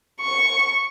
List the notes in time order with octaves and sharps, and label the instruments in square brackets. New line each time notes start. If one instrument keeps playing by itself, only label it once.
[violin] C#6